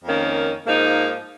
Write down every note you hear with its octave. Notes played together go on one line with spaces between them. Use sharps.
F2 D#3 A#3 C#4
G#2 F3 A#3 D#4